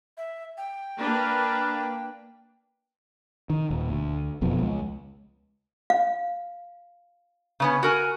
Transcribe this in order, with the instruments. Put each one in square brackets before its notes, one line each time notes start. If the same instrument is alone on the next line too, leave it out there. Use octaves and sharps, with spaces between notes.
[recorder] E5
G5
[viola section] A#3 D4 B4
[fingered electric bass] D#3
D#1
D2
F#1 F2 B2 F3
C#2 G#3
[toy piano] F5
[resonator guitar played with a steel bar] C#3 B3 C#4
F#4 A#4 G#5